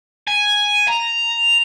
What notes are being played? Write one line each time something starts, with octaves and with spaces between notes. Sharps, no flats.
G#5
A#5